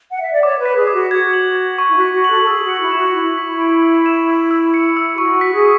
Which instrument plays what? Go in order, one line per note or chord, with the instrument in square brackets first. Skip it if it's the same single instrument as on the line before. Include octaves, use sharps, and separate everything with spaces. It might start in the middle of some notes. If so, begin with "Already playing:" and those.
[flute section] F#5
E5
D5
[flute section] C#5 [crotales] D6
[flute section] B4
[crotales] B6
[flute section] G#4
[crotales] D6
[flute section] F#4
[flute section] F#4 [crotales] G#6
[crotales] F#7
G#6
C#6
[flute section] E4
[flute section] F#4 [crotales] B6
[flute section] F#4
[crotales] F#7
[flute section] A4
A4
[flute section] G#4 [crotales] E6
[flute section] F#4
[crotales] C#7
[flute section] E4
[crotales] E7
[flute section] F#4
[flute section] E4 [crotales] C#6
[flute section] E4 [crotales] B6
[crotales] D7
E6
E7
E6
E6
C#7
E6
[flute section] G#4
[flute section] F#4 [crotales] C#6
[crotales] B6
[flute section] G#4